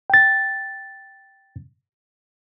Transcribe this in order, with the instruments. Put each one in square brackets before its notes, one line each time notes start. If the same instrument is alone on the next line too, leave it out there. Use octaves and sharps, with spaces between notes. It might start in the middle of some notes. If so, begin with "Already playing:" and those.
[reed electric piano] G5 A6